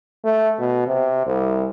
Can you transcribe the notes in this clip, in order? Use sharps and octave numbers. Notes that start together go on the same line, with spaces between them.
A3
B2
C3
C2